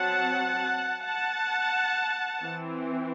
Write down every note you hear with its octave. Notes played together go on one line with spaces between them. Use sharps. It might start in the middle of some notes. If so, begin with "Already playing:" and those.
Already playing: F#3 C4 F#5 A5
F#5 A5
E3 C4